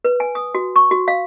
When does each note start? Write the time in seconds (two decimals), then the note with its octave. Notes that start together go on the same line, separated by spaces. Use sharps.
0.05 B4
0.20 G#5
0.35 D#6
0.55 F#4
0.76 C#6
0.91 F#4
1.08 F5